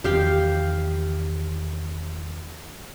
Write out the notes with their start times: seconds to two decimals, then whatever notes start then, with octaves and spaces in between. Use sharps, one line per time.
0.04 E2 D#3 F3 G4 F5 G5